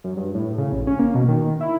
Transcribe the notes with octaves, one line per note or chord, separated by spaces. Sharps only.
F#2
G2
A2
C#3
A1
C#4
A#3
B2
D#3
E4